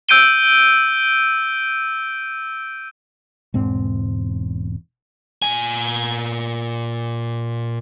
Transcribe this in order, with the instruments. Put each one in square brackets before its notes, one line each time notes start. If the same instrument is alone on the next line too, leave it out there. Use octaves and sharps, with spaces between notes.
[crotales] E6 G6 D7 D#7 G7
[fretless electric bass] E1 G#2 C4
[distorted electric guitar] A#2 G#5